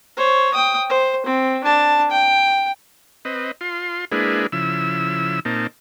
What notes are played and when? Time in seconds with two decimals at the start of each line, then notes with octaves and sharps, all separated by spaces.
0.17 C5 C#5
0.54 G5 D#6
0.89 C5
1.26 C4
1.64 D4 A5
2.11 G5
3.25 C4 B4 D#5
3.61 F4 C6
4.12 G#3 A#3 D4 E4 G#4 B4
4.52 C#3 F3 E4 E6
5.45 A#2 A#3 C4 D#4 A5